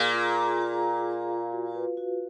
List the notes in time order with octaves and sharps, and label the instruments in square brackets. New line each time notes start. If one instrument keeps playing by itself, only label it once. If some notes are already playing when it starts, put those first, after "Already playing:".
Already playing: [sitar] A#2 A#3 [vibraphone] G#4
[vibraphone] F4
G#4
F4
F4
F4
F5
F#4
B4
F#4